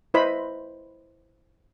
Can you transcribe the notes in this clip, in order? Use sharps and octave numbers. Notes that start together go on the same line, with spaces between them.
E4 B4 C5 D#5 B5